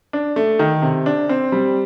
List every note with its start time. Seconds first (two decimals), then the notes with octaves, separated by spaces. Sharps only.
0.13 D4
0.36 A3
0.59 D#3
0.82 C3
1.06 D4
1.29 C4
1.52 G3